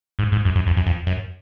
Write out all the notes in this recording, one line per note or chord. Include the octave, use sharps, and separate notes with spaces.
G#2
G#2
F#2
F#2
F2
F#2
F2
F#2